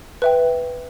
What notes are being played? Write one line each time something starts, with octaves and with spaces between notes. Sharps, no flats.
B4 E5 G5